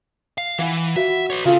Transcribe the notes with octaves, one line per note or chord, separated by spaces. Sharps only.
F5
E3 E4 F#5
F#4 E5 B5
B4 C#5
C#3 F4 A4